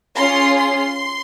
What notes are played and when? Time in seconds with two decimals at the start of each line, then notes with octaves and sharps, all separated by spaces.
0.15 C#4 F4 G#4 C6
0.58 C6